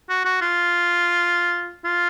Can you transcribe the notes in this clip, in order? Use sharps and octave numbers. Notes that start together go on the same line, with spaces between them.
F#4
F#4
F4
F4